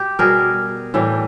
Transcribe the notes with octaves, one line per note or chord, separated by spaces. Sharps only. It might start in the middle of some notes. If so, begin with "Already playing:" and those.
Already playing: G4
B2 G3 G#4 A#4
A2 E3 G3